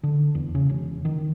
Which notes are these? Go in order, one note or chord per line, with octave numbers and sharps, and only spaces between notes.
D3
E2
C#3
E1
D#3